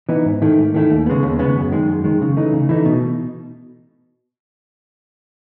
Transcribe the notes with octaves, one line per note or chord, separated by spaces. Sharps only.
E3 B3 D#4
G#2
D#3 A3 E4
G#2
D#3 A3 E4
D#2
C#3 G#3 B3
D#2
C#3 G#3 B3
F#2
D#3 G#3
F#2
D#3 G#3
C#3
E3 A3 D#4
C#3
E3 A3 D#4
B2